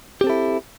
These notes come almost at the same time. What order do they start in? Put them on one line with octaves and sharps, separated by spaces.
G4 C4 A4 E4